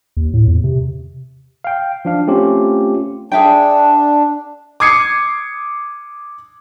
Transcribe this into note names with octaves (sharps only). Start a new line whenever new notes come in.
D#2
A2
E2
C3
F5 G5
F3 D4 F5
A3 C4 C#4 F4 G4
D4 G#4 E5 G5
D6 D#6 G#6 C7 C#7